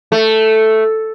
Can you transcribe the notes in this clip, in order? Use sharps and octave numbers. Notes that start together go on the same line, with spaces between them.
A3